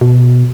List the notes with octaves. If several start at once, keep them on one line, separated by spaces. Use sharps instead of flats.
B2